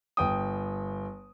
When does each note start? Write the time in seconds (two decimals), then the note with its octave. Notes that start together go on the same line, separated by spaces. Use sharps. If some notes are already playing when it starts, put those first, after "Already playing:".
0.17 G1 G5 D#6